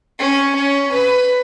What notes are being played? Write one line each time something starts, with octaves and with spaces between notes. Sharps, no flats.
C#4
C#4
B4